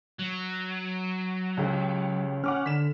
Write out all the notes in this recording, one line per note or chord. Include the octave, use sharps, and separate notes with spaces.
F#3
C#2 C#3 G4
C#4 F#5 D6 F6
D3 B6 E7